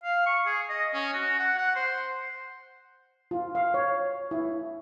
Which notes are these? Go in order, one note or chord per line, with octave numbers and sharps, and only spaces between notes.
F5
C#6
G#4
D#5
C#4
F#4
F#5
F#5
C5
F4
F5
C#5
E4